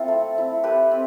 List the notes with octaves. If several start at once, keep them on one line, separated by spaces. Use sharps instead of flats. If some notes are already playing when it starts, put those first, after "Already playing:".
Already playing: C4 E4 F4 A4
A3
C4 E4
A3 G4 B4
C4